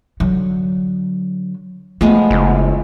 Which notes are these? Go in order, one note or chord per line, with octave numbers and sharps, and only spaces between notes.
D3 F#3
F3 G#3 A3 B3
F#1